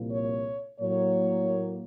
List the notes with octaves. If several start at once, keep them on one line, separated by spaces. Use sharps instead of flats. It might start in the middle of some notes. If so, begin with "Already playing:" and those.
Already playing: C2 A#2 F3 A#3
C#5
A2 F#3 A#3 C#5